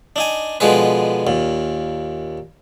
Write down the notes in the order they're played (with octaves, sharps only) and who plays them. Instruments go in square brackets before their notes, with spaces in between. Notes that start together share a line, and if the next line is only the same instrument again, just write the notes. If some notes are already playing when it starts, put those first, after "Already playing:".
[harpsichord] D4 D#4 G#5
B2 D3 F3 G#3 G#4 B4
D#2 A#2